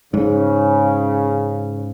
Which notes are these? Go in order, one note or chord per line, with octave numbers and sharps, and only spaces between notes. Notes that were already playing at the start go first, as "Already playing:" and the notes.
G#2 C#3